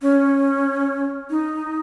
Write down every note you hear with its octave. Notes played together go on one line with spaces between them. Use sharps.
C#4
D#4